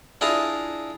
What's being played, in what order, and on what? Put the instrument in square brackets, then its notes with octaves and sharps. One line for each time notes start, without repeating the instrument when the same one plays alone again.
[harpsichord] D4 E4 F4 G#4 A#5